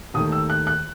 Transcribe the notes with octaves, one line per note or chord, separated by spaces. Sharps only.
D#2 D#3 A3 D#6
E6
F#6
F#6